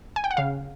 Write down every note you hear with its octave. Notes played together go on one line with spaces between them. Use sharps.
G#5
G5
F#5
C#3 F5